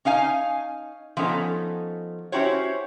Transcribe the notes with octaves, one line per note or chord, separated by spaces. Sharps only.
C#4 D#4 F5 G#5
F3 B3 C#4 D#4 A4
C#4 E4 F#4 G4 C5 C#5